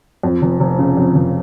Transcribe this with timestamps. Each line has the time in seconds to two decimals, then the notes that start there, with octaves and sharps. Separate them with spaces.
0.23 F2
0.42 F1
0.60 F1
0.79 C#3
0.97 F2
1.15 F1